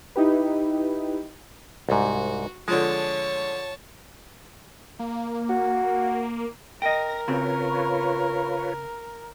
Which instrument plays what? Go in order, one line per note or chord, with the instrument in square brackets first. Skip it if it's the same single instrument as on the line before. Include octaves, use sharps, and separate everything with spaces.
[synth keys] D#4 E4 G4 B4
[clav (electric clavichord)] C2 G#2 [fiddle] F#4
[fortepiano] D3 F3 [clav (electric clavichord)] G#3 [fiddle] C#5 A5
[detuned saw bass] A#3
[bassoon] F#4
[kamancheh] A#4 [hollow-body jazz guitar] D#5 G5 [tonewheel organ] A#6
[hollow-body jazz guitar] C#3 C4 F#4 [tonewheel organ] F4 B4 C#5